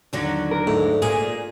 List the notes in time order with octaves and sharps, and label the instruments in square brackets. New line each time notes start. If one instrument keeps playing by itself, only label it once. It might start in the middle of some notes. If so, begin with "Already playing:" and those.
[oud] D#2 D3 F#3
[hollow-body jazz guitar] A#4
[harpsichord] G#2 [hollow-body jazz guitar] A3
[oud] A#2 [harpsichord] G#4